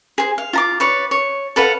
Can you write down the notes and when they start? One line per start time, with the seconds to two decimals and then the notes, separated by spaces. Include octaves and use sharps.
0.18 G#4 C5
0.38 F5
0.53 F4 A#5 D6
0.80 B4 C#5 D5
1.11 C#5
1.56 A4 B4 F5 F#5